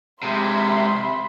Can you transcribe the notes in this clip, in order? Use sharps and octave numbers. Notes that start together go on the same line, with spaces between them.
C3 G#3 E5 B5 C6